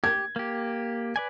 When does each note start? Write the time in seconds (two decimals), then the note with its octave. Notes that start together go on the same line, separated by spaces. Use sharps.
0.04 G4 G#6
0.36 A#3 G4
1.16 B4 D5 G#5